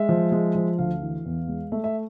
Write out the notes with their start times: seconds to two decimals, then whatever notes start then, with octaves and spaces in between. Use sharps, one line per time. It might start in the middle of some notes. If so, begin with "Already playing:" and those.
Already playing: G#3 E5
0.09 F3
0.32 G#3
0.55 F3
0.78 D2 F5
1.02 E3
1.25 E2
1.48 G#3
1.72 A3 E5
1.84 E5